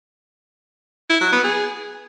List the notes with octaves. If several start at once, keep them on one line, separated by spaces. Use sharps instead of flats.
E4
F#3
B3
G#4